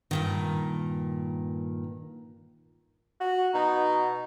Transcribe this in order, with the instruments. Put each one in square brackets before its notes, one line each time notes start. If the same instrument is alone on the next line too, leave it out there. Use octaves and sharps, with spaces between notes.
[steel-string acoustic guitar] G2 A#2 D#3
[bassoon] F#4
[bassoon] B2 [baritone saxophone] D#4